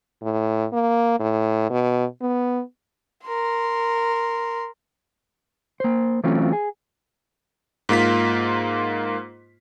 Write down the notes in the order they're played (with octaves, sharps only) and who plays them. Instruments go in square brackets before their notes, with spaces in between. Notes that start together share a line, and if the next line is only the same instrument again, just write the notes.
[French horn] A2
A#3
A2
B2
B3
[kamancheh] A#4 C6
[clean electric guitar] A#3 C5
E3 F#3 A3 C4 C#4 F4
G#4
[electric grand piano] G#2 A#3 F4 B6